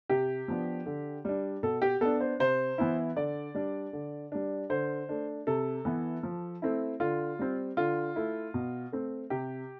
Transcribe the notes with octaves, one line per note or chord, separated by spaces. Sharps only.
C3 G4
F3 B3 D4
D3
G3 D4
B2 A4
G4
B3 D4 A4
C5
C3 C5
E3 B3 E4
D3 D5
G3 D4
D3
G3 D4
D3 C5
A3 D4
C3 A4
E3 B3 E4
F3
A3 C4 E4
D3 F4
G3 C4
D3 F4
A3 E4
B2
A3 C4
C3 G4